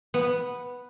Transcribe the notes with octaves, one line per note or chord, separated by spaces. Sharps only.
B3